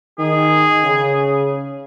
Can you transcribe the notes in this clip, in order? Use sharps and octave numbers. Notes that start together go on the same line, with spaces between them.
D#3 G#4
C#3